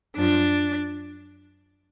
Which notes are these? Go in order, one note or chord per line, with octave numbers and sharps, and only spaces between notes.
F#2 F3 D4